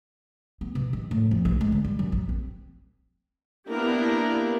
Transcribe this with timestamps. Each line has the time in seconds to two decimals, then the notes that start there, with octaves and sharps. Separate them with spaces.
0.61 B3
0.75 B2
0.93 D#3
1.11 A2
1.31 F2
1.45 B1
1.61 G#3
1.72 D3
1.85 G3
1.99 F#2
2.12 A#1
2.29 C4
3.69 A#3 B3 D4 E4 G4 A#4